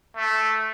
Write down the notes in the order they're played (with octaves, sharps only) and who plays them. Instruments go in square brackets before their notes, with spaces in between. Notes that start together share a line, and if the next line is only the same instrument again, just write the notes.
[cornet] A3